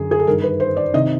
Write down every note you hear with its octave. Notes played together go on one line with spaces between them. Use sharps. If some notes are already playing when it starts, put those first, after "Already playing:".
Already playing: F#2 D3 G#4
G#4
A4
G2 D#3 A#4
B4
C5
D5
C3 D#3 D#5